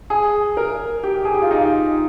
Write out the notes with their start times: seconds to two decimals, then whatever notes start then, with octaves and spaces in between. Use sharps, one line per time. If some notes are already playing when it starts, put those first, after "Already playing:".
0.10 G#4
0.57 A#4
1.03 G4
1.25 G#4
1.34 G4
1.42 F4
1.51 D#4